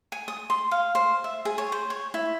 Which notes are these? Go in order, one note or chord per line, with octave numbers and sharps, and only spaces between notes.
G#5
D#6
C6
F5
C5
E5
G#4
C#5
C5
C#5
E4